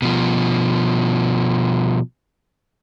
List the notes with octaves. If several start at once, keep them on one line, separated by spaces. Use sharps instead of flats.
B2 F3